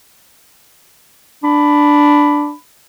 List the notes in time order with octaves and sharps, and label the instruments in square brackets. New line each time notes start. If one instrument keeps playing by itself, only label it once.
[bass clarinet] D4 [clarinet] B5